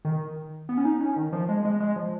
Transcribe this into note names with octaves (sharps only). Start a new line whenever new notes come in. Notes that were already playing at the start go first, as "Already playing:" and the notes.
D#3
B3
C#4
D#4
C#4
D#3
F3
G#3
G#3
G#3
F3